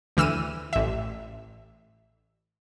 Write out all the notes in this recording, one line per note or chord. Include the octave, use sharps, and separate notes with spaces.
D2 E3 E6 F6 D#7
A1 E5